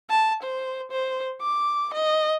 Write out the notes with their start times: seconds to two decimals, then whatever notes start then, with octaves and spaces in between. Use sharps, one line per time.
0.10 A5
0.43 C5
0.91 C5
1.42 D6
1.94 D#5